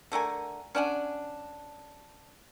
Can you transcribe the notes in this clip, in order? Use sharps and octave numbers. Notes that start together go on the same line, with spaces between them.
D3 A3 A#4 G#5
C#4 D4 F#5 G#5